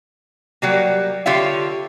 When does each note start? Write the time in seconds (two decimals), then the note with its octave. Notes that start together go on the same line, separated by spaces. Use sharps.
0.62 F#3 G3 A#3
1.26 D3 F4 G4 C#5 E5 F5